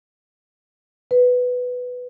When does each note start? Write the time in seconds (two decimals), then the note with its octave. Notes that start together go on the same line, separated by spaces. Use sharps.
1.11 B4